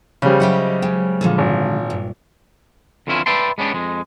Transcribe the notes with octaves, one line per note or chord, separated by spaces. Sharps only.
C#3 F3 G3 B3 G#4 C5
F#3 F#4 G4 D#5 E5 F#5
G#3 G5
A#2 D3 F3 G#3 A4
G#1
G2
F2 D3 E3 C#4 E4 F4
B4 D5 E5 G5 A5 C6
G#3 B3 C#4 D4 G4
F2 G#3